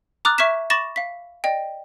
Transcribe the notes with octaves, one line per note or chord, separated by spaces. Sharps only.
A#5 D6 D#6 F6 F#6 A6
E5 C#6 F6 G#6 B6 E7
B5 C#6 D6 A6 A#6 E7
F5 B6
D5 D#5 G5